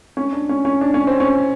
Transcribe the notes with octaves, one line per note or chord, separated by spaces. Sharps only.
C#4
D4
C#4
C#4
D4
C#4
C4
C#4